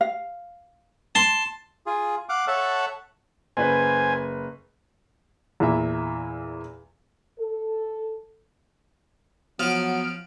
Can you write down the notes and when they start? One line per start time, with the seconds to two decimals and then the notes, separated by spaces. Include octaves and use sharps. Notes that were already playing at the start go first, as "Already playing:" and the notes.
0.01 F5
1.15 A5 C6
1.86 F4 G#4
2.29 F5 F#5 D6
2.48 A4 C#5 E5 F#5 A5
3.57 F#1 B4 C5 G#5
5.60 E2 A#2 E4 E5 A#5
7.39 A4
9.60 F3 F#3 B3 F6 D7